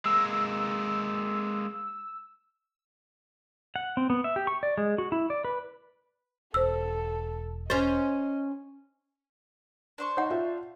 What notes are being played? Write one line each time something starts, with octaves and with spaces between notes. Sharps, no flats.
G#3 A#3 E6
F#5
C4
B3
E5
G4
C#6
D5
G#3
F#4
E4
D5
B4
E1 A4 C5 E6
C#4 C5 D#5 A6
D4 C5 C#6
D#4 C#5 F#5
F4 E5